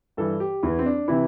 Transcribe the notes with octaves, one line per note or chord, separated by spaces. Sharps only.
G2 E3 A4
G4
E2 E3 E4
C4
D4
C3 E3 E4